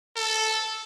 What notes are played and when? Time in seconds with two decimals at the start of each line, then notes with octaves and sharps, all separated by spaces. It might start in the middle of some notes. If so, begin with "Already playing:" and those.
0.16 A4